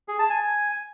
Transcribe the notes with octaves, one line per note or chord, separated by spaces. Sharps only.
G#4
A5
G#5